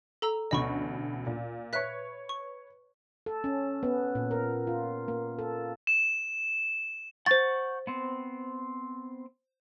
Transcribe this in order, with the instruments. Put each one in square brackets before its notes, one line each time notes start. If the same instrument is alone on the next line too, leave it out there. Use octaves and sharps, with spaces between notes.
[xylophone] A4 A#5 E6
[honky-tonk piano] A1 D2 B2 [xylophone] D#5 B5 C#6
[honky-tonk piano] A#2
[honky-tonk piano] B4 C#5 [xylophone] E5 F#6 B6
[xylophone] C#6
[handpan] A4
C#4
B3
A#2
A#4
F4
A#3
A4
[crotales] E7
[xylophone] C5 A6 [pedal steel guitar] F#5 C#6 G6
[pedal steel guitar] B3 C4